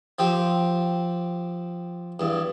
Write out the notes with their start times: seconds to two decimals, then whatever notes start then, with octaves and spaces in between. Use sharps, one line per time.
0.19 F3 C4 G4
2.20 E2 G2